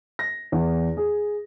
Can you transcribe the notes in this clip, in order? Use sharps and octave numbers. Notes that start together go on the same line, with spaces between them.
A#6
E2
G#4